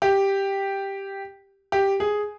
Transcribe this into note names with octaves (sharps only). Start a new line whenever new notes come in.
G4
G4
G#4